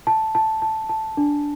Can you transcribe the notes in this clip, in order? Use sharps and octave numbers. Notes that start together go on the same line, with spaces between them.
A5
A5
A5
A5
D4